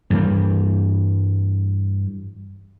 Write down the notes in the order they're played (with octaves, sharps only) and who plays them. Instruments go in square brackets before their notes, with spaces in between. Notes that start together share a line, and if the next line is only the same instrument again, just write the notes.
[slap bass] G2 E3 G3